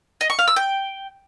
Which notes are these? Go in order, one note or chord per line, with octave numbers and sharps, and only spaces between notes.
D#5
C#6
F5
E6
G5